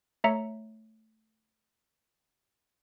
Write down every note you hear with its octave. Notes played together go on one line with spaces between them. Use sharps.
A3 C#5 E5 A#5 C#7